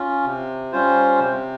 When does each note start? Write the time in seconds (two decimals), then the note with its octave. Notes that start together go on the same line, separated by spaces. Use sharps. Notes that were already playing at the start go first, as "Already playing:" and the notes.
Already playing: C#4 F4
0.25 C3
0.72 G3 C#4 F4 C5
1.20 C3